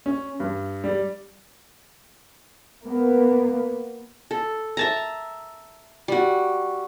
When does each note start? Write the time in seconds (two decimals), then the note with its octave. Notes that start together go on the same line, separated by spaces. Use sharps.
0.06 C#4
0.40 G2
0.84 G3
2.84 A#3 B3
4.31 A4
4.77 E5 A5 A#5
6.08 G3 F#4